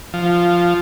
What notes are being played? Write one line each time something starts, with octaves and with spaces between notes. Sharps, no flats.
F3